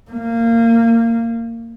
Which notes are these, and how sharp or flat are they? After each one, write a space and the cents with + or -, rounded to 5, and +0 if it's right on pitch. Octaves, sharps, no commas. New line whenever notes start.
A#3 -20